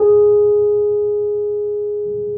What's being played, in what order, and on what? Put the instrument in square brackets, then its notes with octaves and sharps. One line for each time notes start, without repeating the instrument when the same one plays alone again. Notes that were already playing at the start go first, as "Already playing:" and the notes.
Already playing: [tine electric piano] G#4